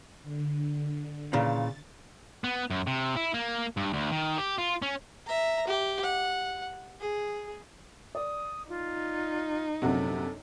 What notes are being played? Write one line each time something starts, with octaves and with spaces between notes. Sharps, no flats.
D3
A#2 C#3 E3 A6
B3
F#2
C3
E4
A#3
G2
D2
D#3
G4
F4
C#4
E5 A#5
G4
F#5
G#4
D5 D#6
D#4 F4
A#1 F#2 C3 F#4 A4